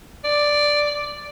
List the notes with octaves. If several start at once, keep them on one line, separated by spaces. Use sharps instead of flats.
D5